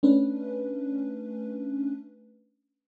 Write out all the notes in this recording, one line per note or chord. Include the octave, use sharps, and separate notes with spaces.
A3 C#4 D4 B4